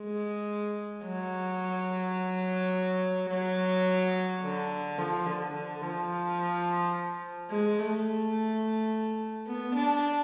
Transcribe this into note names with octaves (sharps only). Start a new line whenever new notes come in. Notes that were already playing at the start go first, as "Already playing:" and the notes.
Already playing: G#3
F#3
F#3
D3
F3
D3
D3
F3
G#3
A3
B3
D4